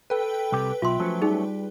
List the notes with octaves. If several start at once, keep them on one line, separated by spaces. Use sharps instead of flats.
A4 B4 G5
C2 C3 G4
B1 F4 E5 C6
F3 F#3 A3 C#4
G3 D#4 G#4